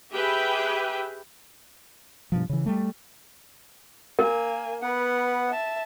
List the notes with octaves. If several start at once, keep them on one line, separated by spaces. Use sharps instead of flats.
G4 G#4 B4 E5 G5
G2 B2 F3
C#3 E3
G3 A3
A#3 A#4 G#5
B3 B4 F#5
E5 A5